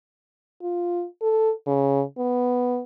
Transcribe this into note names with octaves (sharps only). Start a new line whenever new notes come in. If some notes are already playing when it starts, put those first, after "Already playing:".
F4
A4
C#3
B3